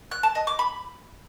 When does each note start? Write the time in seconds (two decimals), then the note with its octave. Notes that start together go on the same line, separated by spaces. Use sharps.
0.11 F#6
0.23 A5
0.35 D#5
0.47 D6
0.59 B5